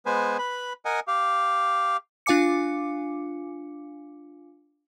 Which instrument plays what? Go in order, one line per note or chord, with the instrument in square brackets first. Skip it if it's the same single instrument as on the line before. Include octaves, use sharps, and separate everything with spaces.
[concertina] G#3 B3 B4 C5 G#5
B4 B5
A#4 D#5 F#5 G#5
G4 F5
[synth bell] D4 F4 F5 G#5 D6 C#7